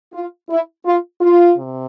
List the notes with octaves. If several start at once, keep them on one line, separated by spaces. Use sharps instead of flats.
F4
E4
F4
F4
C3